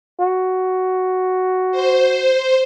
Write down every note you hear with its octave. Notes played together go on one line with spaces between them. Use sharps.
F#4
C5